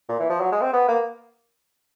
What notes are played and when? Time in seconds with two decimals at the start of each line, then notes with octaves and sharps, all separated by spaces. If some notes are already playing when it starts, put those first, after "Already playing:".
0.09 A#2
0.20 E3
0.30 F3
0.41 F#3
0.52 G#3
0.61 C4
0.73 B3
0.88 A#3